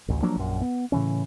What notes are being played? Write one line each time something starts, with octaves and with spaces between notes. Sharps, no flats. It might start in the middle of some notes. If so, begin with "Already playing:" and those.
A1 D2
F3 F#3 A#3 D4
A#1 F#2
B3
A2 C#3 E3 C#4